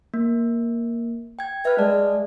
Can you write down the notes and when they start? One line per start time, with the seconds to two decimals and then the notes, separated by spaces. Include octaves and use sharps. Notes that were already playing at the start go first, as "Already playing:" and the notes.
0.14 A#3
1.39 G5 G#6
1.65 B4 E5 F6
1.79 G#3 D5 A5